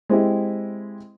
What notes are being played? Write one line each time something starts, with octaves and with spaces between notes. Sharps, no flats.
G#3 C4 E4 G4